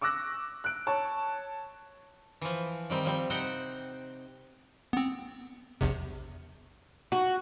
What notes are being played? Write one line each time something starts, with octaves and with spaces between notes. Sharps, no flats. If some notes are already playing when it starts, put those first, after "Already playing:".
C#6 D6 E6 F#6 A#6
F#6 D7
C#5 A5 C#6
E3 F3
D#3 G3 C4
F3 G3 C4
C3 C4 D#4 C5 F#5 G5
B3 C4
A#1 E2 C3
F#4